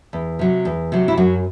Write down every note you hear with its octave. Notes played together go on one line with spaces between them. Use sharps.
E2
C3 F#3
E2
C3 F#3
E4
F#2 F#3 F#4